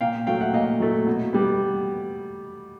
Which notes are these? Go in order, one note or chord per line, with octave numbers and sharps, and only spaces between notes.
A#2 F5 G5
F#3 A3 F5 G5
E5 F#5
A#2 D#5 F5
F#3 A3
B2
G3 B3